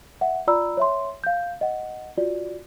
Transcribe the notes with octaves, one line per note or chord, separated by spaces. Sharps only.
E5 F#5
F4 D5 A#5 B5 E6
C#5 E5 C6
F5 G6
D#5 F#5
F4 F#4 D5